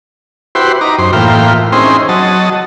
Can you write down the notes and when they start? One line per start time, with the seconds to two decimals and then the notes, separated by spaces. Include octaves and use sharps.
0.55 E4 F#4 G4 B4 C5
0.81 D#4 A#5 D6
0.98 F#2 C5
1.13 A2 E3 A#3 F4 G5
1.72 C4 C#4 D#4 E4 G#4 C5
2.09 F#3 D#5 A5